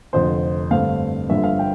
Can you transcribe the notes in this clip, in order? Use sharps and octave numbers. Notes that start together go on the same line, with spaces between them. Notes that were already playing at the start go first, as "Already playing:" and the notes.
F1 F2 D3 C5
G2 D3 A3 C4 F5
G1 G2 D3 F3 E5
F5
G5